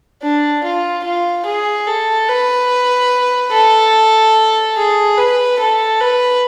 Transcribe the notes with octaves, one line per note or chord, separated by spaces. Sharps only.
D4
F4
F4
G#4
A4
B4
A4
G#4
B4
A4
B4